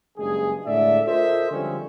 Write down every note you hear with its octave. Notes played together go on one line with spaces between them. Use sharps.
F#1 G2 G#3 G#4
A2 D3 G#3 D5 E5
F4 A4 A#4 C5 D#5 E5
D3 F3 G3 G#3 C4 C#4